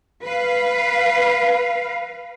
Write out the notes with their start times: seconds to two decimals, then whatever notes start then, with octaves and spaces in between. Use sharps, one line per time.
0.23 B4 F5